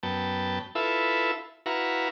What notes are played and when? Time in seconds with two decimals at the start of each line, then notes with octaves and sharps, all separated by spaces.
0.03 F#2 B3 G5 A5
0.75 E4 F4 A4 B4 E5
1.66 E4 F#4 B4 F5 A#5